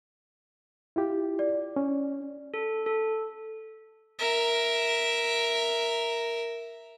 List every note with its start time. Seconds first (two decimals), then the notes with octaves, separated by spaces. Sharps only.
0.96 E4 F4 G4
1.39 D5
1.76 C#4
2.54 A4
2.86 A4
4.19 A#4 E5